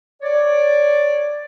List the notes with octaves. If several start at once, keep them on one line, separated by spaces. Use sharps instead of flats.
C#5 D5